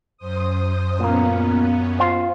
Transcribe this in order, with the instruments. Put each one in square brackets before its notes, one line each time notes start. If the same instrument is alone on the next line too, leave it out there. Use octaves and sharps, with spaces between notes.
[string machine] F#2 C5 D#6
[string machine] F#2 B3 C#4 [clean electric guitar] A#2 A#3
[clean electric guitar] F4 C5